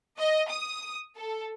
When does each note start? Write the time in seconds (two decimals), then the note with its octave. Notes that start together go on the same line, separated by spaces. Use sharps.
0.18 D#5
0.50 D#6
1.16 A4